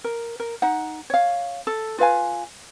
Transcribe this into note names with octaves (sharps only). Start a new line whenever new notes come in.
A#4
A#4
D#4 F#5
C#5 F5
A4
F4 B4 F5 G#5